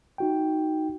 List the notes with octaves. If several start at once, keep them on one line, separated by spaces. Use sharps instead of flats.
D#4 F#4 G5